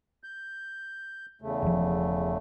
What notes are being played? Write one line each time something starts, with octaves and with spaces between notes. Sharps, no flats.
G6
E2 C#3 A3
E1 F3